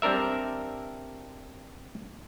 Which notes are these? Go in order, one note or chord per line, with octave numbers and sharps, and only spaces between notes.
G3 C4 D4 A#4 E5